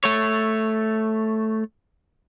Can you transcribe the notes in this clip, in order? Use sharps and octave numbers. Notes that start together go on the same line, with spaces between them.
A3 C#5